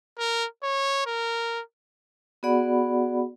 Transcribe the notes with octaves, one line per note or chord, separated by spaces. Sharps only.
A#4
C#5
A#4
B3 F#4 G#4 D5 F#5 B5